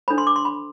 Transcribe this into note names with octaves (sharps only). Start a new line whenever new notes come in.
D4 A4 C5 B5
C6
D6
C6
B5